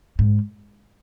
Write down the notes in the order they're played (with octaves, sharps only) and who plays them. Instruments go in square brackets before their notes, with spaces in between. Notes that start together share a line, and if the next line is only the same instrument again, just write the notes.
[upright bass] G#2